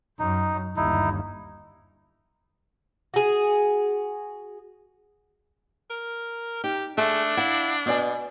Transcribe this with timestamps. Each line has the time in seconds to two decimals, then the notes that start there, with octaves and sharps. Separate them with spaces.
0.19 F#2 D#4
0.77 G1 D#2 D#4 E4
3.14 F#4 G#4
5.90 A#4
6.64 D#4 G4
6.97 A3 D4 G#4
7.37 E4 F5 F#5
7.86 B2 B3 D5 G#5